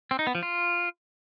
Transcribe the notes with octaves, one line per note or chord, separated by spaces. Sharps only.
C4
D#4
B3
F3
F4